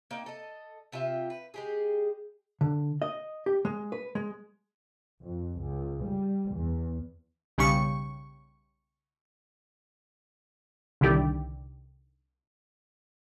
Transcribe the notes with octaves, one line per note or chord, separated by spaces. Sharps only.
A#3 D#4 G5
A4 D#5
C3 F4 G4 E5
B4
G#3 G4 G#4
D3
D#5
G4
G#3
B4
G#3
F2
C#2
G3
E2
B1 C#3 G3 C#6
C2 D3 D#3 E4 G4 D5